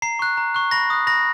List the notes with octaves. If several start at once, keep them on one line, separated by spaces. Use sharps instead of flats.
A#5 C7
C#6 F#6
A#5
C#6 F#6
B5 A#6
D#6 F#6
B5 A#6